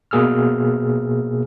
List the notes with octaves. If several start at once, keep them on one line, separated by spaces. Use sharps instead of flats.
B2 A#3 G#4 E6 F6